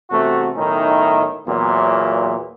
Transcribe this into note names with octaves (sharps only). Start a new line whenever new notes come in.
E2 C3 A3 F#4
B1 A2 D#3 C#4 D#4 E4
E2 A#2 F#3